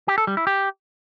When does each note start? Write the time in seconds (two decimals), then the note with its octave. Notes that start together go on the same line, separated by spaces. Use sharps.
0.08 G4
0.18 A4
0.27 G3
0.37 E4
0.47 G4